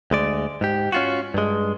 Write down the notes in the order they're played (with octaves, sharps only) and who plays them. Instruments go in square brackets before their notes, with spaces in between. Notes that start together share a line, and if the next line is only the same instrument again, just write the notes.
[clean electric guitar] D2 G#3 D5
G#2 G4
C#4 F4 F#4
G2 G#3